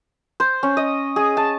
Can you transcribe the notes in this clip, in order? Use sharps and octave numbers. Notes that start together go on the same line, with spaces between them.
C5
C#4
D#5
G#4
A5